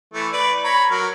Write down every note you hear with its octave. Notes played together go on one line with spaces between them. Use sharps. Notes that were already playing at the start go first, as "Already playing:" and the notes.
E3 A3
B4 D5
C#5 A#5 B5
F#3 A#4 F6